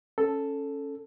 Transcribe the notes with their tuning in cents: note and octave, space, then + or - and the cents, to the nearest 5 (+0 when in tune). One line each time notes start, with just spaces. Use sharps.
C#4 -5 A4 +0